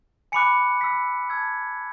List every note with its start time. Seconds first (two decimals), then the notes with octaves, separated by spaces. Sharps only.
0.32 G#5 B5 D6 F#6 C#7
0.81 B5 E6 B6
1.30 A5 E6 G#6